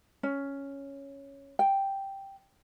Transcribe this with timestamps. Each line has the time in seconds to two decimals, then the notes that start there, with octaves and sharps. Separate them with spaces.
0.23 C#4
1.59 G5